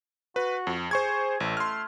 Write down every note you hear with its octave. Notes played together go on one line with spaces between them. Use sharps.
F#4 B4
F2
G#4 C5 C#6 G#6
A1 A3
C6 F6